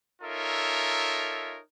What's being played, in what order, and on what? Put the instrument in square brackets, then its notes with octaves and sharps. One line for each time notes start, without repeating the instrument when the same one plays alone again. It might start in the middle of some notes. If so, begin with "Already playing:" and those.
[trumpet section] D#4 F4 A4 A#4 C#5 E5